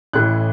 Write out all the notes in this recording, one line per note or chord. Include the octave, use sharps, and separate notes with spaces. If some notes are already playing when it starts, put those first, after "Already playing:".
A1 A2 E3 F#6